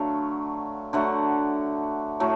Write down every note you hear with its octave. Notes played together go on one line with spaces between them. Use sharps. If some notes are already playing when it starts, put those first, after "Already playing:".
Already playing: D3 F#3 A3 F5
D3 F#3 A3 F#5
A2 F#3 A3